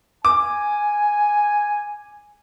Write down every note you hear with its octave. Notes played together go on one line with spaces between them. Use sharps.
G#5 D6